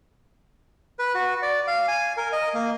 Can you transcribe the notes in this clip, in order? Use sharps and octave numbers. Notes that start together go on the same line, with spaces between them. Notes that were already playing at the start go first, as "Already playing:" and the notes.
B4
F#4
D5
F5
G#5
A#4
D#5
A#3